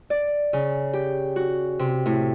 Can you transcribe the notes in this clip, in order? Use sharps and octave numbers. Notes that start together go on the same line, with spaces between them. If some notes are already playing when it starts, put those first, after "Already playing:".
D5
C#3
G4
F#4
C3
A2